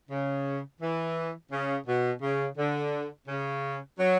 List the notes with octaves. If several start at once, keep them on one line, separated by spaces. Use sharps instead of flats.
C#3
E3
C#3
B2
C#3
D3
C#3
F#3